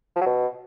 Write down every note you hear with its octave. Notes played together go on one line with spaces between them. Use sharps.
F3
F#3
B2